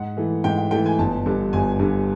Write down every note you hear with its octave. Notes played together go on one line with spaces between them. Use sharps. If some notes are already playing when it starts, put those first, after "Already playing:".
Already playing: G#2 F#5
E3 A3
G#2 G5
G5
E3 A3 G5
G#5
G1 A5
G2 D3
G1 G#5
G2 D3